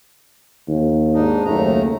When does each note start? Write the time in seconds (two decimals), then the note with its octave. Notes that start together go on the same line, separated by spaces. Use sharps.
0.68 D#2
1.14 G#2 D4 D#4
1.45 F#1 D#2 A3 A#5